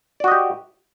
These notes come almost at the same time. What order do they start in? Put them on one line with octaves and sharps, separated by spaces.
D5 F#4 D#5 G4